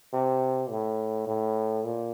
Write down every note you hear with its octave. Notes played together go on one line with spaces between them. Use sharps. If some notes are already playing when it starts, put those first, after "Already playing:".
C3
A2
A2
A#2